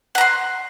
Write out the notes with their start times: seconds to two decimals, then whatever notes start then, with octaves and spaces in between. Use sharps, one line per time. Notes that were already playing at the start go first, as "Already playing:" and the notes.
0.15 F#5
0.18 A#5
0.21 C6